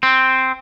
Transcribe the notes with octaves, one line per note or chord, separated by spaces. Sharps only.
C4